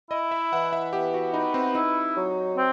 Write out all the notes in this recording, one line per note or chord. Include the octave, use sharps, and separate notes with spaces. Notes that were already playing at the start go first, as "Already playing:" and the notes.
E4 D#5
E5
E3 F#5
E5
B3 G4
F#4
D#4 B4
C4
D#4 E4
F#3
C4